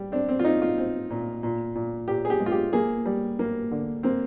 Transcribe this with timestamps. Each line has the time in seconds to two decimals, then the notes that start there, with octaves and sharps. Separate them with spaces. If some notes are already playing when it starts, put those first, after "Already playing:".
Already playing: G3
0.12 C4 D4
0.29 C4
0.39 F4
0.44 C4 D#4
0.62 F4
0.78 C4
1.10 A#2
1.43 A#2
1.75 A#2
2.08 A#2 G4
2.25 G#4
2.30 G4
2.40 G#3
2.46 F4
2.52 G4
2.73 A#3 G#4
3.06 G3
3.39 A#3
3.71 D3
4.03 A#3 C4